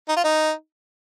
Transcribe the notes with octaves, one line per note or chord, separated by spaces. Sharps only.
D#4
F4
D#4